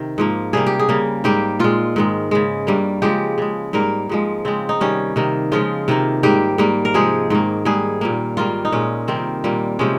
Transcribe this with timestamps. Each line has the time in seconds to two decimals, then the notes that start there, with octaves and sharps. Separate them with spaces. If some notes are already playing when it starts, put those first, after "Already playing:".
Already playing: C3 D#3
0.18 G#2 F3 A#3
0.53 C3 G3 A#3 G#4
0.66 G4
0.79 G#4
0.89 C#3 G3 A#3
1.24 G#2 G3 A#3 G4
1.59 A#2 G#3 F4
1.96 G#2 D#3 G#3
2.31 C#3 G#3
2.67 G2 G3 A#3
3.02 C#3 F3 G#3 G4
3.38 C#3 G#3
3.73 G#2 G3 A#3 A#4
4.09 G#2 F3 G#3
4.45 C#3 G#3 C4
4.69 D#4
4.81 C3 D#3 G3 C#4
5.16 C3 D#3 A#3
5.52 C#3 F3 G#3 F4
5.88 C3 D#3 A#3
6.23 G#2 G3 A#3 G4
6.58 G#2 G3 A#3
6.85 A#4
6.94 C3 F3 G#3 G#4
7.30 G#2 D#3 A#3
7.65 G#2 G3 A#3 G#4
8.01 A#2 G3 A#3
8.37 G#2 D#3 G3 A#3 F4
8.65 D#4
8.72 A#2 G#3 C#4
9.08 C3 D#3 G3 A#3 C4
9.44 A#2 G3 A#3
9.79 C3 F3 G#3 C#4